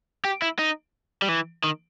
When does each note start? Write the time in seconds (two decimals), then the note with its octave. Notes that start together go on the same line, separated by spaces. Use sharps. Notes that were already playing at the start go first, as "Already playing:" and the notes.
0.25 G4
0.42 E4
0.59 D#4
1.22 G3
1.29 E3
1.64 D#3